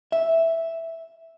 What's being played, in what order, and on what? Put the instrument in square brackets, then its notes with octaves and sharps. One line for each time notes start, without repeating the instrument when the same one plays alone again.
[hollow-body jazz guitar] E5